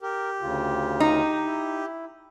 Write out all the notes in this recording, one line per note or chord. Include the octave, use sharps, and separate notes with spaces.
G4 A#4
D2 C#3 F4
D#4
E4